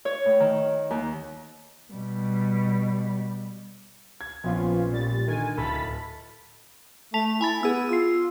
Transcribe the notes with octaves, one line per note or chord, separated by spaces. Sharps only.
C#5
A2
D#3
D#2
B2 G3
G#6
A#1 F3 B3 C#4 F4
A#2 G3 A6
D3 D#3 G#5
D1 A4 B5 A6 B6
A3 A5 B6 F7
E4 G#5 B5 A6
B3 G#4 E6
F4 E6 C7